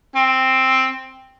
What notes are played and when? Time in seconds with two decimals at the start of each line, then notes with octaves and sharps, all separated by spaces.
0.15 C4